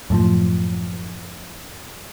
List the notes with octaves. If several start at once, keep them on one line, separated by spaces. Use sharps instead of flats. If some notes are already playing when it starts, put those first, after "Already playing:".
F#2 A2 F3